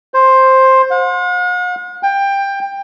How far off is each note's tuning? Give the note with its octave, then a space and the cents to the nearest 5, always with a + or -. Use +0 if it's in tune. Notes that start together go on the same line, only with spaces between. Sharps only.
C5 +10
F#5 -45
G5 +20